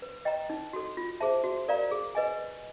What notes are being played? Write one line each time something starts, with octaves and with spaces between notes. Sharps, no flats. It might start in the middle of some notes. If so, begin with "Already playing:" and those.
B4
D#5 G5 A#5
D#4
F#4 A4
F4
G#4 C5 E5 A5
F#4
A#4 D5 F5 A#5
G#4
B4 D#5 G#5